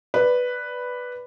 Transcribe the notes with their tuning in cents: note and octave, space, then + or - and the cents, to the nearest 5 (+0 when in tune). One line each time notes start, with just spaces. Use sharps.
B4 +0 D5 +0